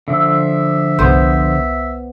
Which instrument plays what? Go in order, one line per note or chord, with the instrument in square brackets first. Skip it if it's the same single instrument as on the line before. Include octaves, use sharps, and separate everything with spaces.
[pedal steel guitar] D3 F3 E6 [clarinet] E5
[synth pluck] G1 C2 [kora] B3 C5